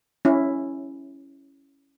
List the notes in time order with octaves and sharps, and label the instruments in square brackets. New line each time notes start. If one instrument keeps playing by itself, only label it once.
[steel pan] C#4 E4